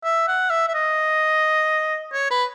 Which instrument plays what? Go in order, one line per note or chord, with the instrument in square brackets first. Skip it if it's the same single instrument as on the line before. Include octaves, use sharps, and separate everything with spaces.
[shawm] E5
F#5
E5
E5
D#5
C#5
B4